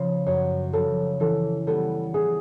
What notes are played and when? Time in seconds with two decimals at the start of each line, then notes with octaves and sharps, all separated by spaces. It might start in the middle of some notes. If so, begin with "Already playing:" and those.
Already playing: C#3 F3
0.26 F#2 C#5
0.73 C#3 F3 A4
1.20 E3 A4
1.67 G3 B3 A4
2.14 E3 G#4